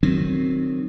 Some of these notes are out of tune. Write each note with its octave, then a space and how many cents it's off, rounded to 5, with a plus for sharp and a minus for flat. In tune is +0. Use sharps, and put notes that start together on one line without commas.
D#3 -25 F#3 +0 C4 +0